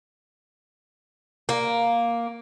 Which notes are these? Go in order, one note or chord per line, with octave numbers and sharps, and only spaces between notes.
A#3